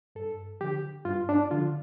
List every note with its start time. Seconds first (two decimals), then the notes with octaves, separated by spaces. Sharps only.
0.15 G2 A4
0.61 D3 F3 G4
1.05 G2 F4
1.29 D4
1.51 D3 F3 F4